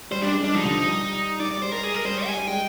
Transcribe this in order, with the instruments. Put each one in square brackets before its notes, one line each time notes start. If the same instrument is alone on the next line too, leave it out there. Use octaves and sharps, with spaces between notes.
[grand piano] G3 [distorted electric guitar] C5
[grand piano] G3 [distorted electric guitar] D4
[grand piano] G#3
[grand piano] G3 [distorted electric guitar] D4
[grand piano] F3 [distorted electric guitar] D#4
[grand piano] D3
F3
G3
[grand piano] G3 [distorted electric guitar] D5
[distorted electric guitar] D5
[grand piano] G3
[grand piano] G#3 [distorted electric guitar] C5
[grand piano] G3 [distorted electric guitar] A#4
[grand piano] G#3 [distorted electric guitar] G#4
[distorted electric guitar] A#4
[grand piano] G3 [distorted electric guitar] C5
[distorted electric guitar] G#5
[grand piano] G3
[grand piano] G#3 [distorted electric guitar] G5